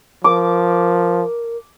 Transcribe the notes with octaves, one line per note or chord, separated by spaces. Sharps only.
F3 A#4 D6